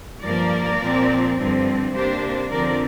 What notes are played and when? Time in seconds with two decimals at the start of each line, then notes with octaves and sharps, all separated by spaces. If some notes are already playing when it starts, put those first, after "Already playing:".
0.23 G2 F3 A#3 A#4 D5
0.80 A#2 F3 C4
1.37 G2 D3 F3 C4
1.93 C3 A#3 D4 G4 C5
2.50 F2 D3 F3 C4 A#4 D5